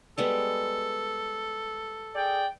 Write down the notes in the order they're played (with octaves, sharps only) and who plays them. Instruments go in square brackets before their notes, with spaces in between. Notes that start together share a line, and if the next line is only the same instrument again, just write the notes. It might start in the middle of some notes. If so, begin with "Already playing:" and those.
[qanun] G3 G#3 B3 [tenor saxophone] A4
[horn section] G#4 D5 G5